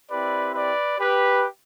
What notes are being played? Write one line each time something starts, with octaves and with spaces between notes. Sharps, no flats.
C4 E4 G4 B4 D5
B4 D5
G4 B4